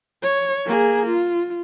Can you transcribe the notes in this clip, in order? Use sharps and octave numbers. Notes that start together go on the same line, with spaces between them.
C#5
A#3 G#4
F4